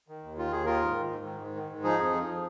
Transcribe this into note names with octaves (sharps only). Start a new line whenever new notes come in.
D#3
D#2
D#3 F4
D#2 G#4
D#3 F4 A#4
G#2
D#3
G#2
D#3
G#2
D#3
G#2
F3 D#4 G#4
F2
F3